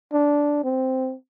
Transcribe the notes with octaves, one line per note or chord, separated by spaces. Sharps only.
D4
C4